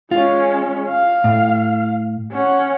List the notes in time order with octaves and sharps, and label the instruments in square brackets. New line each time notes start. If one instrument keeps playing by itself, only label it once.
[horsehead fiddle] G#3 C#4 [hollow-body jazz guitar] F4
[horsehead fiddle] F5
[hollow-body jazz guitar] A2
[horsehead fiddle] C#4 F#5